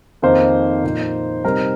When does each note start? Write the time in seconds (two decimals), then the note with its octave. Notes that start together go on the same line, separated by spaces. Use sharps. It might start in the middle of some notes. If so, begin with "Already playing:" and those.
0.22 F2 D#3 A#3 D#4 C5
0.83 A#2 F3 A#3 D#4
1.44 C3 G3 C4 D#4 A#4